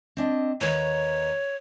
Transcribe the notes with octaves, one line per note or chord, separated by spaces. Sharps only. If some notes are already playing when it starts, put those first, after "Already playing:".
C4 D4 D#5
D#2 B4 C#5 A#5